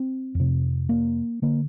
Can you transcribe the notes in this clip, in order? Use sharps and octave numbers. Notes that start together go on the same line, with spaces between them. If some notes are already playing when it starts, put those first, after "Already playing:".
Already playing: C4
F2 C3
A#3
D3 A#3